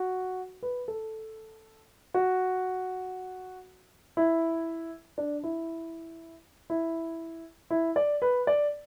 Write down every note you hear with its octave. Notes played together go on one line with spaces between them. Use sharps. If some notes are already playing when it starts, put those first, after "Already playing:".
Already playing: F#4
B4
A4
F#4
E4
D4
E4
E4
E4
D5
B4
D5